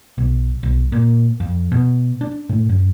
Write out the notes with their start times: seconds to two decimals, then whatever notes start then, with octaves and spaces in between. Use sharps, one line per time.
0.18 B1
0.63 B1
0.92 A#2
1.40 F2
1.72 B2
2.21 D4
2.49 A2
2.69 F#2